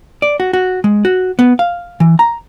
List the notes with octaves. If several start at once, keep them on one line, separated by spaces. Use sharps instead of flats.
D5
F#4
F#4
G#3
F#4
B3
F5
E3
A#5